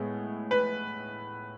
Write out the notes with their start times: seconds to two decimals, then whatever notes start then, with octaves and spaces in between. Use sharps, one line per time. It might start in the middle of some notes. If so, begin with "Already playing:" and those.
Already playing: A2 G#3 B3
0.51 B4